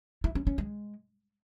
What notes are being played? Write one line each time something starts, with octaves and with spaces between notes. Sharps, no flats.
E4
C#4
C#4
G#3